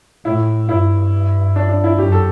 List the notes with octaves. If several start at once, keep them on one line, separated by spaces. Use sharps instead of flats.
A2 E4
G2 E4
D4
D4
E4
F#2 G4
A4